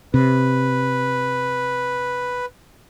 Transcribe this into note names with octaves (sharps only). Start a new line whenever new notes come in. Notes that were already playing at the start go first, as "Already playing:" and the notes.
C3 B4